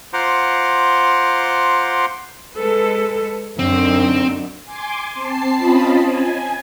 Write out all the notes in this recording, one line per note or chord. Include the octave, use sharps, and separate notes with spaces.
F4 C5 F#5 A#5 C6 D6
G#3 A4 B4
F#2 D3 C4 D#4
G#5 C6 D6
C4 A5 C7
C4 C#4 F4 D#5 A5 B5
G#5